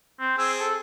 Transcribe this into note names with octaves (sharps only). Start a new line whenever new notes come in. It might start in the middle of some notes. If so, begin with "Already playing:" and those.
C4
C4 G#4 E6
A4